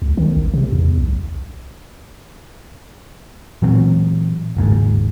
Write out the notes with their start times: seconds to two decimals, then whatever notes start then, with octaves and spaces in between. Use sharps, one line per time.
0.02 C#2
0.17 D#3
0.37 A1
0.54 C3
0.72 E2
0.98 B1
3.62 A#2 E3 F#3 C4
4.57 F#1 D#2 G#2